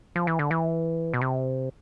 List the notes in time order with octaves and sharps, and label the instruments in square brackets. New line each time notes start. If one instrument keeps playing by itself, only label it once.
[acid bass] F3
E3
D3
E3
B2
C3